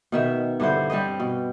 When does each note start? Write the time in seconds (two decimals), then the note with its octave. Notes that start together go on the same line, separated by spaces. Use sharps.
0.12 B2 D#3 E5
0.60 G2 D3 E4 C5
0.90 G3 C4 C5 D#5
1.20 B2